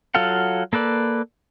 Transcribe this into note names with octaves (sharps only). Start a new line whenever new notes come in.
F#3 F4 A4 F5 F#5
A#3 A4 B4 D5